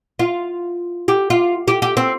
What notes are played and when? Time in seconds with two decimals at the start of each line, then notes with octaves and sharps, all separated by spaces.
0.19 F4
1.08 G4
1.30 F4
1.68 G4
1.82 G4
1.97 C4